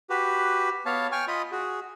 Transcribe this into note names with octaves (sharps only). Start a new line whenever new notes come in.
F#4 G4 B4
B3 C#5 F5 A5
G5 G#5 C#6 F6
F4 D#5 B5 D#6
F#4 G#4